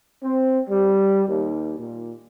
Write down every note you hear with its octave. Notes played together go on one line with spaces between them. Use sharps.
C4
G3
D#2
A#2